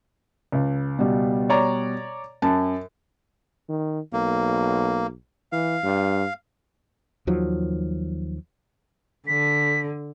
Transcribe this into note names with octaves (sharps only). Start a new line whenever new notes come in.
C#2
B2 G3
C#5 D5 A#5
F#2 A5
D#3
B1 A#3
E3 F5
G2
D#2 D#3 F3 F#3
D3 B6